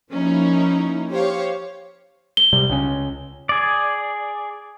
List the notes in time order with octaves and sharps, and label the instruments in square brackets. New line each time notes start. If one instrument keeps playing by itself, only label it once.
[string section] F3 A#3 C#4 D#4 E4
G4 C5 C#5 F5
[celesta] G7
[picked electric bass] C3 G3
C#2 C#3 C#4
[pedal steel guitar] G#4 D5